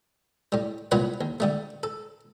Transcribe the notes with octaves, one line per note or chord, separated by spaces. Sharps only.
A2 G3
C2 A#2 B3 F4 B4 C#5
D#2
D3 G3 A3
A4